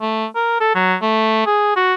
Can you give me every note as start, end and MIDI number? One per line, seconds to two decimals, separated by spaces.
0.01 0.26 57
0.35 0.56 70
0.60 0.70 69
0.75 0.95 54
1.02 1.42 57
1.46 1.72 68
1.76 1.95 66